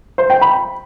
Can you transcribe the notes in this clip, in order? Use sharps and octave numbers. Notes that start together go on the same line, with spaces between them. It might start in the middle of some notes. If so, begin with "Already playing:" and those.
C5
G5
B5